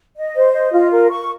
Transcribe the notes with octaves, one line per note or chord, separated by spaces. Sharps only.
D#5
C5
D#5
F4
A#4
C#6